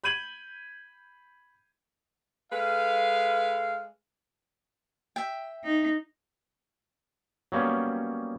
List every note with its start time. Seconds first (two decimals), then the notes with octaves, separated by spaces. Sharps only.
0.04 B5 G6 G#6 D#7 F#7
2.52 G#3 A4 B4 F5
5.16 E5 G5
5.64 D#4
7.52 F#3 G3 A#3 B3 C#4